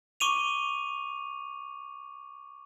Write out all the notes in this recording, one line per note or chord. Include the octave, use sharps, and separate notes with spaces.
C#6 D6 D#7 F7